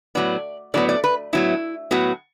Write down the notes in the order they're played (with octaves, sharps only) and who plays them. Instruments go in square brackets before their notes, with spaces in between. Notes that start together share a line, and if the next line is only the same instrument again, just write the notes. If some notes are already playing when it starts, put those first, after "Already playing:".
[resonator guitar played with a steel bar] A2 F#3 B3 D5
A2 F#3 B3 D5
D5
B4
A2 F#3 B3 E4
A2 F#3 B3 F#4